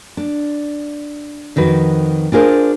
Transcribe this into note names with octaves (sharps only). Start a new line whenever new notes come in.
D4
F2 D#3 F#4 B4
D4 F4 G#4 A#4 C5